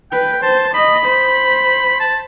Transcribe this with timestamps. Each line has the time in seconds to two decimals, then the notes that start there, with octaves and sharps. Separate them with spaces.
0.12 B4 G5
0.42 C5 A5
0.74 D#5 B5
1.05 C5
2.00 A5